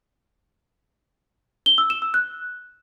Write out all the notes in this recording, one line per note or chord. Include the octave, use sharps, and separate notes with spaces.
G7
E6
E7
E6
F#6